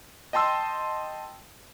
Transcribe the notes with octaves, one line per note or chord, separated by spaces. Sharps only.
D#5 G5 A5 C6 E6